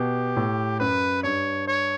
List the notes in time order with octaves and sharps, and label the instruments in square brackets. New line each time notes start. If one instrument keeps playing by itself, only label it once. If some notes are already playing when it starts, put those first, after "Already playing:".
Already playing: [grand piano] B2 [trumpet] G4
[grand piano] A2
[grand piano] F#2 [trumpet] B4
[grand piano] G2 [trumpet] C#5
[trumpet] C#5